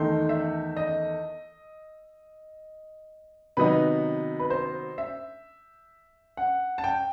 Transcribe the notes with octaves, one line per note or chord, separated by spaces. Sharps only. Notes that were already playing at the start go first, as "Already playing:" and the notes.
Already playing: E2 D#3 A3 D#4 C6
E5
D#5
C3 D#3 F#3 B3 D#4 B4
B4
C5
E5
F#5
A5
G5